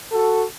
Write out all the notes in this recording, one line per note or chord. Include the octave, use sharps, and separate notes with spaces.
F#4 A4